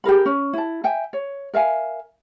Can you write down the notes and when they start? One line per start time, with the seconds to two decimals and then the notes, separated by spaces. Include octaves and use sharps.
0.04 G4 G#4 A#4 B5
0.26 C#4
0.53 E4 A5
0.84 E5 G5 G#5
1.13 C#5
1.54 A#4 E5 F5 G#5